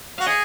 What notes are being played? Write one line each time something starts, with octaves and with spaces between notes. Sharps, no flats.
F#4 F5
G#4 D#5 F#5